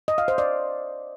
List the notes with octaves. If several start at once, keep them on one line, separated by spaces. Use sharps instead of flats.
D#5
F5
C5
D5